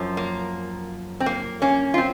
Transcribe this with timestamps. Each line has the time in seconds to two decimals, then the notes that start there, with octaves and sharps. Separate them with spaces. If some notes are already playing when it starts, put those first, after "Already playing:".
Already playing: F#2 F3
0.17 A#3
1.20 C4
1.26 A#3
1.62 A#3 C#4
1.94 F4
1.98 C4